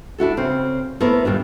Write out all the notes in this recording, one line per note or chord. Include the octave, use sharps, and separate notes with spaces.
D4 E4 F#4 A4
C#3 C4
A3 B3 E4 A#4 C5
D#2 A#2 G3 D4